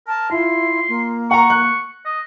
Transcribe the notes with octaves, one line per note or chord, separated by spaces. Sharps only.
A#4 A5
E4 F4 C6
A#3
F#5 A#5 C#6
F#6
D#5